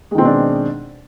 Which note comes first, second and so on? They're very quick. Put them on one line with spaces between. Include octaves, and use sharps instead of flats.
G#3 D#3 C4 B2 D4